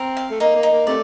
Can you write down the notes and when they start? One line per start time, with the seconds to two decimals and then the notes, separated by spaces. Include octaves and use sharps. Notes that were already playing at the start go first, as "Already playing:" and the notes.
Already playing: C4 A#4
0.17 F5
0.31 A3
0.40 A#3 D#4
0.56 A#3
0.63 D#4
0.72 A#3
0.87 C3 A3 D5